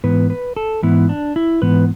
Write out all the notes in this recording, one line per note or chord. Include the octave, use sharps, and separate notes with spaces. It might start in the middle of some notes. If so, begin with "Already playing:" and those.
G#2 E3 B3 B4
B4
A4
G#2 E3 B3 E4
D4
E4
G#2 E3 B3 B4